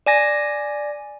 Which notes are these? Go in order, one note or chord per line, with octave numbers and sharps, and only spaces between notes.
D5 G#5 A#6